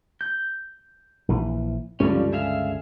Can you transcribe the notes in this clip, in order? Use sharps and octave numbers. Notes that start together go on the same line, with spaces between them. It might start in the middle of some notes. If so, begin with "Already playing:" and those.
G6
A#1 E3
C#2 G2 D3 F3 G3 C#4
G#4 E5 F5